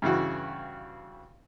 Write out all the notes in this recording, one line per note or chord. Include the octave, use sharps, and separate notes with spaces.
G2 C#3 E3 F#4